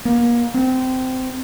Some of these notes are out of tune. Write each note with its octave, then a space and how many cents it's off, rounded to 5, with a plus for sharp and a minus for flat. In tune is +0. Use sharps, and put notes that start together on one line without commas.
A#3 +35
C4 -20